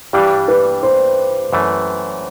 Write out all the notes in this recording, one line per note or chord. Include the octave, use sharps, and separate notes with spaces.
G2 E3 G3 D4 G4
B4
C5
F#2 E3 A3